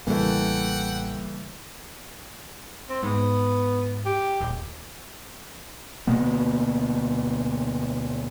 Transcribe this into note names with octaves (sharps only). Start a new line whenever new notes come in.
A1 C#3 E3 G3 A3 A#3 F#5 G5
C4
G#2 B3
G4
D#1
D2 B2 A#3 B3